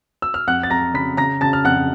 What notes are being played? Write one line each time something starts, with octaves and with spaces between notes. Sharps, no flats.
E6
F6
F2 F#5 F#6
A6
F2 A#5 A#6
C#3 B5 B6
C#3 A#5 A#6
C#3 A5 A6
F6
F2 F#5 F#6